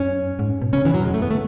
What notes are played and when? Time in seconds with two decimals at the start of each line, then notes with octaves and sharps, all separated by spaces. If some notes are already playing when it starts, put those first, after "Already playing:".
Already playing: F#2 C#4
0.39 G#2
0.62 B2
0.73 C#3 C#4
0.83 B2 E3
0.94 F#2 F#3
1.05 E2 G#3
1.14 A3
1.17 F#2
1.22 B3
1.28 D3 A3